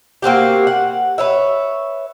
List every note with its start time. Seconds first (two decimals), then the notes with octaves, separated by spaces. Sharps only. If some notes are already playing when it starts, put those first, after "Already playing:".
0.22 A#3 C4 F#4 G4
0.67 F#5
1.18 B4 C#5 E5